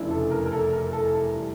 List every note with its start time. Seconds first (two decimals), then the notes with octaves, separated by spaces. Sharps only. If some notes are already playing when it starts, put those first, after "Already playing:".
Already playing: F1 E2 C#3 E3 D4 E4
0.11 A4
0.31 A#4
0.46 A#4
0.52 A4
0.73 A#4
0.93 A4
1.15 A4
1.35 E3 G3